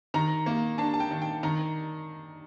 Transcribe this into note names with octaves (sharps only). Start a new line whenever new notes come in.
D#3 A#5
A#3
D4 A5
A5
G5
D#3
G5
D#3 A#5